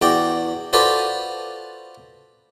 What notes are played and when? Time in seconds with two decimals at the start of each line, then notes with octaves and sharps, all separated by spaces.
0.02 E2 F#4 D5 G5
0.73 F4 F#4 A4 B4 C5 D5